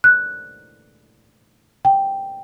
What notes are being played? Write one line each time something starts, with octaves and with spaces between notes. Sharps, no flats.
F#6
G5